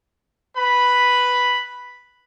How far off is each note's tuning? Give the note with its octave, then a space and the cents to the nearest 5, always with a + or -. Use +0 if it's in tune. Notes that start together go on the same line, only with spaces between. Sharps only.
B4 +0 B5 +0